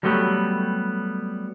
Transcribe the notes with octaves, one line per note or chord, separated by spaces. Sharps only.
F#3 G3 A3 B3 G4